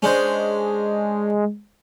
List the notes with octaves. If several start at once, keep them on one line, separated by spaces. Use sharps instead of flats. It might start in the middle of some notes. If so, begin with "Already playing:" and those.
G#3 C#4 D4 C5